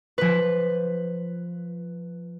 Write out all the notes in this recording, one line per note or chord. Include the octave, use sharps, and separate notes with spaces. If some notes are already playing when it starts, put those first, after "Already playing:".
F3 B4